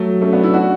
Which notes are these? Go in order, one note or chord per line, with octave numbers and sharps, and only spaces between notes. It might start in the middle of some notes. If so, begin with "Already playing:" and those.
Already playing: F#3 A3
A3 C#4
B3 D4
C#4 E4
D4 F#4